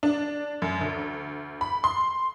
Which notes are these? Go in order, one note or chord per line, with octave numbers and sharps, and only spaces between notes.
D4
F#2
D2
B5
C6